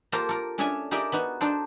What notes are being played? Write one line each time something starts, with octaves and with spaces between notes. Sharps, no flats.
A#3 F4 G4 A4 A#4 C5
A4 A#4
C#4 D4 G#4 A4 E5 G#5
D#4 G4 G#4 A#4 D5 E5
B3 D#4 F#4
D4 D#4 A4 C5